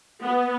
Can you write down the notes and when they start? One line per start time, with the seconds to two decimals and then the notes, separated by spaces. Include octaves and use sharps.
0.21 B3